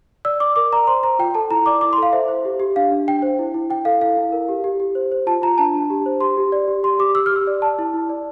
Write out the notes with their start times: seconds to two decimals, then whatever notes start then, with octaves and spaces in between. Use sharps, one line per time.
0.25 D5 E6
0.40 D5 D6
0.56 A#4 D6
0.72 D5 A#5
0.87 C5 C6
1.03 C5 A#5
1.19 F4 G5
1.35 A4 A5
1.50 E4 A#5
1.66 D5 D6
1.81 E4 D6
1.93 C6
1.98 A4 F5
2.13 C5 E5
2.28 C5
2.45 G4
2.60 G4
2.76 D4 F5
2.91 D4
3.08 D4 G5
3.22 C5
3.39 E4
3.54 E4
3.70 E4 G5
3.85 A4 F5
4.01 E4 F5
4.17 E4
4.32 A#4
4.49 G4
4.64 G4
4.80 G4
4.95 C5
5.12 C5
5.27 F4 A5
5.42 F4 A#5
5.58 D4 A5
5.74 D4
5.90 G4
6.06 C5
6.21 G4 C6
6.37 G4
6.52 D5
6.68 G4
6.83 G4 C6
6.99 G4 D6
7.15 G4 E6
7.26 F6
7.32 G4 E6
7.47 D5
7.62 D5 A5
7.79 E4
7.94 E4
8.09 D5